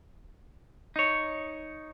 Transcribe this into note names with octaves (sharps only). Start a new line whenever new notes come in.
D#4 C#5